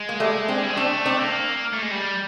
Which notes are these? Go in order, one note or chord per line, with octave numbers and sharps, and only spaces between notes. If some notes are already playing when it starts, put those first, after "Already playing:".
Already playing: G#3
A#3
G3 A3
C4 D4
G3
G#3
A3 C4 D4
C4 D4
A#3
A3
G#3
G3